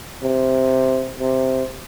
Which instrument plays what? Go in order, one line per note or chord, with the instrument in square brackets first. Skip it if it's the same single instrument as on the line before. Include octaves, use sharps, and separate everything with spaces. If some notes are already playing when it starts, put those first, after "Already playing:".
[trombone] C3
C3